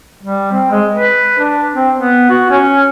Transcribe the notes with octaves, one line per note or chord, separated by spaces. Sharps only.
G3
C4
G#3
B4
D4
C4
B3
F#4
C#4